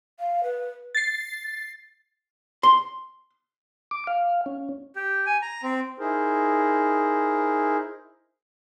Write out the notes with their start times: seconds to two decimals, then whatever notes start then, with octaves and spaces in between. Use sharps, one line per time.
0.19 F5
0.44 B4
0.95 A6 C7
2.63 C6
3.91 D6
4.07 F5
4.46 C#4
4.96 G4
5.26 G#5
5.42 A#5
5.63 C4
5.99 D#4 E4 G#4 A#4 C5